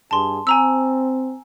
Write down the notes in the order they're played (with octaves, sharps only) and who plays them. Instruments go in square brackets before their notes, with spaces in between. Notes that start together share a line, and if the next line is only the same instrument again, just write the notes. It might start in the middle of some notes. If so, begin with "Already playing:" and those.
[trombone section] G2 G#4 [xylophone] A5 C6
[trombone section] C4 [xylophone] G#5 A#5 E6